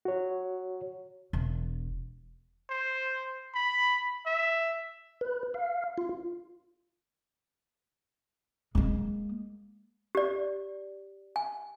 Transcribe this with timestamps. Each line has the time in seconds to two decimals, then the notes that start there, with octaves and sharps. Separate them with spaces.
0.05 F#4 C#5
1.33 E1
2.70 C5
3.54 B5
4.26 E5
5.21 B4
5.54 F5
5.98 F4
8.75 G#3 A#3
10.15 G4 D5
11.36 G#5